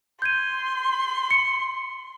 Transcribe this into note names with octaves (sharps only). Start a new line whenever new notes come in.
C6 G6 G#6 D#7
C#7